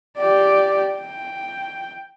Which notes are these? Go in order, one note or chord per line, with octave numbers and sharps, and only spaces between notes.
G4 D5
G5